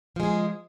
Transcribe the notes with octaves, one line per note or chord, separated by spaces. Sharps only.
F3 G#3 G#4